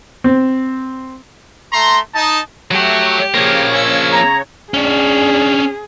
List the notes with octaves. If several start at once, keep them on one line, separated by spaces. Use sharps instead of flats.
C4
A3 A#5 C6
D#4 A5
F#3 A3 F#4 G4
C#3 F3 A#3 C#5
C#4 E6
A#5
C#4 D4 G#4